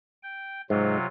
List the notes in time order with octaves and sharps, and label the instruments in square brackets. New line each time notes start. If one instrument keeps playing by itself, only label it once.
[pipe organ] G5
[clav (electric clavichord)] G#2 [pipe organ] C3 F#3 F4